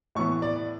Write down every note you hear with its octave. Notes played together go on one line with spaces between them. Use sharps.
A2 E3 B3 C#6
D5